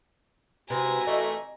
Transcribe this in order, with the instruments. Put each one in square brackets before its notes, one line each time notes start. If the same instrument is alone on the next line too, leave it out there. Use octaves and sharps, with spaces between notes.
[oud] C3 [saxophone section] G#3 E4 B4 [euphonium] F#4 [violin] G#5 A#5
[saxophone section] A#2 E3 A3 [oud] D#5